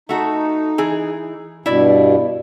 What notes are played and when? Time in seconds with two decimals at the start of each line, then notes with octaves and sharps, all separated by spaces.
0.09 A3 D#4 F#4 A4
0.78 E3 G#4
1.66 G2 B2 E4 D5